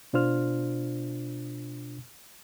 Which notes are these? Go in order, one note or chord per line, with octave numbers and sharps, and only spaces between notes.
B2 D4 F4 C5 F6